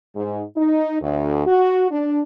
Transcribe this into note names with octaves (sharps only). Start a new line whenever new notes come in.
G#2
D#4
D2
F#4
D4